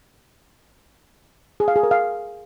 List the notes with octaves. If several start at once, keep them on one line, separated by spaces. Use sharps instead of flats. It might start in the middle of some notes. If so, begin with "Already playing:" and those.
G#4
F5
G#4
A#4
F5